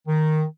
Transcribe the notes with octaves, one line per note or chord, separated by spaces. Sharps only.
D#3